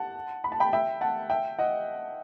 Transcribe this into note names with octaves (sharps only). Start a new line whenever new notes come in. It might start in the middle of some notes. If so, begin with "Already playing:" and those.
Already playing: F#5 A5
B5
A5
G5 B5
E5 G5
F#5 A5
E5 G5
D#5 F#5